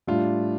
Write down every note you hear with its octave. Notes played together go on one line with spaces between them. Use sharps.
A2 G3 D4 F4